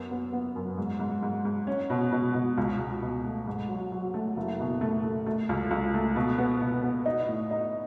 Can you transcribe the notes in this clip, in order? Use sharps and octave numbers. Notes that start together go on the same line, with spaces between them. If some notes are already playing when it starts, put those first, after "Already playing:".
Already playing: F#2 B3
B3
B3
F#2
G#2
G#2
G#2
G#2
C#4
B2
B2
B2
C#2
C#2
B2
A3
G#2
F#3
F#3
A3
F#1
B2
A3
A3
A3
C#2
C#2
A3
B2
B3
B2
B3
D#4
A2
D#4